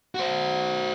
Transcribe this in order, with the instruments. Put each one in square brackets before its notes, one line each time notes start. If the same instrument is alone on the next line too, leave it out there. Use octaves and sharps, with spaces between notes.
[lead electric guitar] F#4 C5